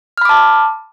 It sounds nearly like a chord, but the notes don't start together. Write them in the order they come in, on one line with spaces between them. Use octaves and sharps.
F6 B5 D6 A5